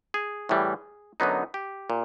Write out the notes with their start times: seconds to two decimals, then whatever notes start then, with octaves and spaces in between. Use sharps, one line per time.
0.14 G#4
0.49 A2 E3 G3
1.20 F#2 D3 F#3 B3 D#4
1.54 G4
1.90 A#2